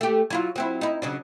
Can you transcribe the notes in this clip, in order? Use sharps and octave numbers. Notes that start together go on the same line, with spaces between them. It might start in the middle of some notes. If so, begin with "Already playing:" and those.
A3 G4
F#3 E4 F4
F#3 C4 E4
D#4 E4
C#3 F#3 D4